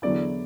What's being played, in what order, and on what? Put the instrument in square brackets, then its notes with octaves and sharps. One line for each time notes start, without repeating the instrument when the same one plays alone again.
[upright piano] E2 D3 F#3 B3 E4 D5